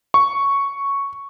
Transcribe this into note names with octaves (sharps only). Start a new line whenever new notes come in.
C#6